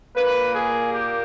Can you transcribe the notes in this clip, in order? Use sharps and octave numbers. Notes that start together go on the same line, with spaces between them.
A#2 A#3 B4
G#4
G4